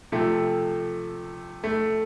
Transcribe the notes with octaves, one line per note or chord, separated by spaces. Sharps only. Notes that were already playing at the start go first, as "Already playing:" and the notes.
C3 F3 A3
A3